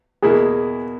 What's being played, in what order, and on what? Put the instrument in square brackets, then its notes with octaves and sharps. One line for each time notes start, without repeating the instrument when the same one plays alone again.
[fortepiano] E2 B2 A#3 E4 [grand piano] G#4